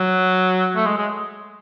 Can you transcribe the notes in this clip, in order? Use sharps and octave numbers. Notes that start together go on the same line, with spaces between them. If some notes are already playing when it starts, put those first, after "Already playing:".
Already playing: F#3
A3
G#3
G#3